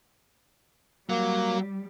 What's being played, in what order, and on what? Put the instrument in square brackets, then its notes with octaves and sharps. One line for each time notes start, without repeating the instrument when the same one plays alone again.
[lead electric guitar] F#3 [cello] G3 [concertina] A#3